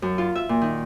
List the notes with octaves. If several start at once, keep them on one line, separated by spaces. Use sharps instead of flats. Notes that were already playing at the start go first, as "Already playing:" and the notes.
F#2
F4
E5
A#2
D#3